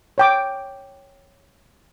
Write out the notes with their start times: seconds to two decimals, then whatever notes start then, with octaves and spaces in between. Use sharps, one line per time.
0.18 C#5 G5 D6